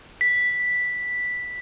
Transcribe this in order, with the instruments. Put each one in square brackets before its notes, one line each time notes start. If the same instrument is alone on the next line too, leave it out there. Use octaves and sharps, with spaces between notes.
[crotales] B6